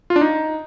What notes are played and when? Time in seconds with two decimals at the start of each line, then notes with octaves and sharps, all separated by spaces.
0.10 F4
0.16 D4
0.21 D#4